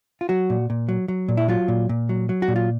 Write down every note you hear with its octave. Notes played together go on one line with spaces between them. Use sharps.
F4
F#3 F#4
A#2
A#2
F#3
F#3
A#2
E4
F#3 F4
A#2
A#2
F#3
F#3
F#4
A#2
F4